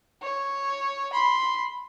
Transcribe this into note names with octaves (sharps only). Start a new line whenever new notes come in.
C#5
B5 C6